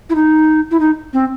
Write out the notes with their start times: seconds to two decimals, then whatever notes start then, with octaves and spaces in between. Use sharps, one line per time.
0.10 E4
0.15 D#4
0.71 E4
0.80 D#4
1.13 C4